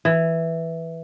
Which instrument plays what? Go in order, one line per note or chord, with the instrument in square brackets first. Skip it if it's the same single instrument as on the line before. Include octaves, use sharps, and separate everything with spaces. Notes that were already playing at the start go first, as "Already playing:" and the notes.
[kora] E3